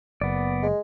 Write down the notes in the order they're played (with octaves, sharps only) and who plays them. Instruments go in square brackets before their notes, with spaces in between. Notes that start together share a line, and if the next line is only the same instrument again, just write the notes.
[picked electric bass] F#1 [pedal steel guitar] B3 D5
[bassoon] G#3